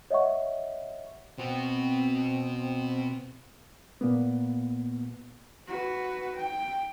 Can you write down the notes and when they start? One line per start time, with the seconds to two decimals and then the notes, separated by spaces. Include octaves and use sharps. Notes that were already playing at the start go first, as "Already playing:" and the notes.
0.11 C#5 D#5 E5 F#5 C#6
1.38 B2 C4 F#4
4.01 A#2 A#3 B3
5.68 F#4 B4
6.36 G5